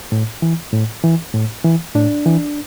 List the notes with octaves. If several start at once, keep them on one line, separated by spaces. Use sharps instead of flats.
A2
E3
A2
E3
A2
E3
A2 D4
E3